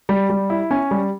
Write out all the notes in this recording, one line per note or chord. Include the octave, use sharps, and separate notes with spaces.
G3
G3
E4
C#4 G#5
G3